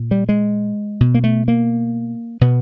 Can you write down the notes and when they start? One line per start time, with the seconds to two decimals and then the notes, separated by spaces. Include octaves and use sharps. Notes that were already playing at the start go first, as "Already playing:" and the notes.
Already playing: A#2
0.11 G3
0.29 G#3
1.00 B2
1.15 A#3
1.24 A3
1.48 A#3
2.41 B2 B3